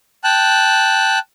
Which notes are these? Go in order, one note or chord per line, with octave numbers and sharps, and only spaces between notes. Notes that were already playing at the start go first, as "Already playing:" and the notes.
G5 A5 F#6